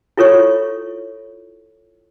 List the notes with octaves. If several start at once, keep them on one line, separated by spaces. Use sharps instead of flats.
E4 F4 A4 C#5 C#6